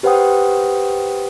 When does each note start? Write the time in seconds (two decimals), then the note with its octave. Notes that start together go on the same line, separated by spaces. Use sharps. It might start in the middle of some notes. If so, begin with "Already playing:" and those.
0.03 G4 B4 C5 F#5 G5 D#6